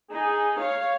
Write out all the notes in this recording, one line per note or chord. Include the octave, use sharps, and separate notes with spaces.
D#4 G#4
C#5 F5